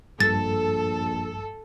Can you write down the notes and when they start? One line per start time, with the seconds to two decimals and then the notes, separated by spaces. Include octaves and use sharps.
0.20 A#1 G2 A4 A6